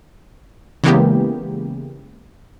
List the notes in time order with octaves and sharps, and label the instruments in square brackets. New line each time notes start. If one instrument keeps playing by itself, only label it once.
[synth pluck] C#3 E3 G#3 A#3 B3 G4